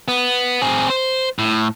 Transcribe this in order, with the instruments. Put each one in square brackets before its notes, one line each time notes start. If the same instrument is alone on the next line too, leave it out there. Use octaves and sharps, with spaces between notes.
[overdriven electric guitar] B3
C4 G#4
C5
A2